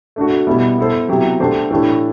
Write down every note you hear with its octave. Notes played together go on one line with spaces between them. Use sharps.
A3 D4 F#4
B2 G3 B3 E4
B3 E4 A4 C5
C3 F#3 B3 E4 G4
D3 A3 D4 G4 C5
A2 E3 A3 D4 G4